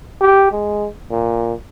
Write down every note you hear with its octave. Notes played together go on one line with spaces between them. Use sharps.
G4
G#3
A#2